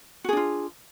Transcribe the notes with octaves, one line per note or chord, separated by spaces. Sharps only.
D4 F4 F#4 G#4